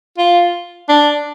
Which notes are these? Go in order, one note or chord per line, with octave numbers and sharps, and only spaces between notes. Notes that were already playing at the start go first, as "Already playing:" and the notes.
F4
D4